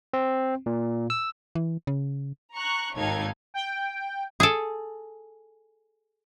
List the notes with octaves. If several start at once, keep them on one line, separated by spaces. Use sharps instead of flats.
C4
A#2
E6
E3
C#3
A#5 C#6 F#6
G#1 D#2 D#4 A4 F5 G#6
G5
G#4 A4